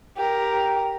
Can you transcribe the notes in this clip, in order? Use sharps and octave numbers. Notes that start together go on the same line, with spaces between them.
G4 A#4